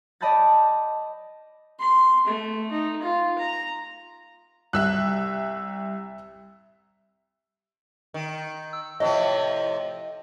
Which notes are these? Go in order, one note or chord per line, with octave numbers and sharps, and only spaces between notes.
D5 D#5 A5 B5 G6 A6
C6
A3
D#4
F4
A#5
C2 E5 E6 F#6
D#3
E6
A2 C3 F3 D#5